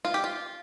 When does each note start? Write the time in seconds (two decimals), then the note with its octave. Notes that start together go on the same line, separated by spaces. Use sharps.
0.05 F4
0.14 G4
0.24 F4